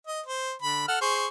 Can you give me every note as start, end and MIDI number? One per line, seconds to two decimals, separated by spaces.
0.07 0.21 75
0.26 0.52 72
0.62 0.84 50
0.62 0.84 83
0.88 0.99 69
0.88 0.99 78
0.88 0.99 89
1.01 1.28 68
1.01 1.28 72
1.01 1.28 85